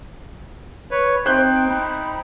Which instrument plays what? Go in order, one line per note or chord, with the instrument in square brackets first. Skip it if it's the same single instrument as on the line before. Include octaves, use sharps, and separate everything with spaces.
[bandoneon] B4 C#5
[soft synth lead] C4 [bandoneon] D#4 [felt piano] C5 F#6 G6 [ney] G5
[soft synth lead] G5 [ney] B5